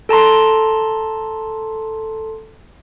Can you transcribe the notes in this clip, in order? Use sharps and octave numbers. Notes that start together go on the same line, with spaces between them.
A4 A5 A#5 C6